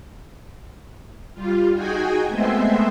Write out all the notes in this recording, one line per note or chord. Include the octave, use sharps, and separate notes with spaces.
G3 F4
D#4 F#4 G#4 G5 G#5
G#3 A3 B3 C4 C5 E5